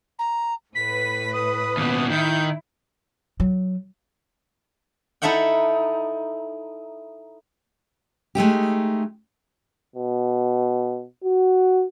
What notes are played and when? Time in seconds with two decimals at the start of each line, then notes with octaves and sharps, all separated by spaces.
0.18 A#5
0.75 A2 B4 B6
1.33 D#6
1.77 D#2 B2
2.10 D#3 E4 G6
3.40 F#3
5.22 D#4 E4 A4 E5 F#5 G5
8.35 G#3 A3 D#4 G4
9.96 B2
11.24 F#4